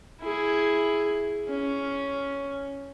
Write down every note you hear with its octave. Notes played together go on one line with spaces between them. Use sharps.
E4 G#4
C#4